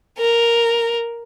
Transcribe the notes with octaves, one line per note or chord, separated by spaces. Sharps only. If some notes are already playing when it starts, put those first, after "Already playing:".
A#4